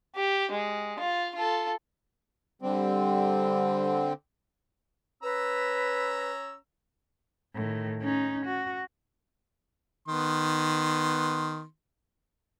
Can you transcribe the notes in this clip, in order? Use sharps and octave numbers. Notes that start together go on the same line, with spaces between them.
G4
G#3
F4
F4 A4
D3 G3 C4
C#4 B4 A#5 E6
A2 D#3
C#4 D#4
F#4
D#3 B3 C6